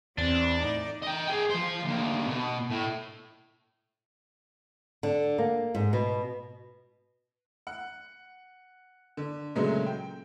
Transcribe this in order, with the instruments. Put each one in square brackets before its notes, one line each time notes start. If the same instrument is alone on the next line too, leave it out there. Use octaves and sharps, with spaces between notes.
[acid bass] E2 [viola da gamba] C4 [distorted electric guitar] D4
[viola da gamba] A2 D#4 D5
[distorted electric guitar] D#5 G5
G#4 G5
F3 C5
D2 A#3
B2
A2
[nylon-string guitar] D3
A#3
G#2
B2
[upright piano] F#5
D3
A#2 C#3 F#3 G#3 A3
G5